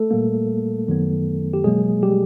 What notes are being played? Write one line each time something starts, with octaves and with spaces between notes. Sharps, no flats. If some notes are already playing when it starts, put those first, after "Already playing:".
Already playing: A3 A4
A#2 G3 A#3
F#2 D#3 F#3 B3
G4
B2 F#3 G#3 A#3 G#4
G3 G4